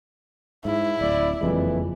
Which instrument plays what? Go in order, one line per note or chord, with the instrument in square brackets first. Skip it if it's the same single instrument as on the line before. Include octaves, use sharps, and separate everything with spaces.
[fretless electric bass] G#2 [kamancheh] E4
[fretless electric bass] D1 [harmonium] D5
[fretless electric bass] F#1 F2 G#3 [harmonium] E3